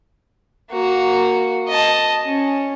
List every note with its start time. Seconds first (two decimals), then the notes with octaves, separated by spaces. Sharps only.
0.72 A#3 F#4
1.69 D#5 A5
2.24 C#4